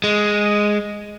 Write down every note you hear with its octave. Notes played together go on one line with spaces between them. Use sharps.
G#3